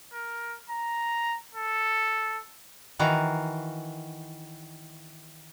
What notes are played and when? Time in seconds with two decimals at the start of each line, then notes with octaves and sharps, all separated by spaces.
0.13 A#4
0.69 A#5
1.55 A4
2.99 D#3 E3 F#4 F5 A#5